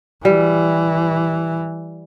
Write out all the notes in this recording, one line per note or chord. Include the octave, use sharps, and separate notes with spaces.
E3 G3